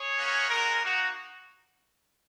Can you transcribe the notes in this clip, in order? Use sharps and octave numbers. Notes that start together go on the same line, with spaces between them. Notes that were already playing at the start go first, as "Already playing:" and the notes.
Already playing: G#4 C#5
A#3 C#4 F#4
G#3 C#4 F#4 A#4
A#3 D#4 F#4